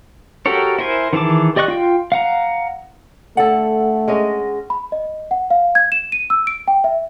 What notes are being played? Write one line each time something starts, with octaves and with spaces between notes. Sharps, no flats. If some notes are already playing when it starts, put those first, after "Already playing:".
F#4 G4 A4 A#4 C#5
E4 A#4 C5 G#5
D#3 E3 G#4 A5 D6
G4 D5 D#5 C#6 F#6
F4 G5
F5 F#5 A#5
D3 A3 A4 F#5
G#3 C#4 D#5
B5
D#5
F#5
F5
G#6
E7
D#7
E6
D7
G5
E5